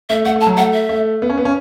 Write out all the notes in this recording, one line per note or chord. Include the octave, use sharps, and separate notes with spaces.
A3 E5
A3 F#5
A3
A5
F#3
A3 F#5
E5
A3
B3
C#4
B3
C#4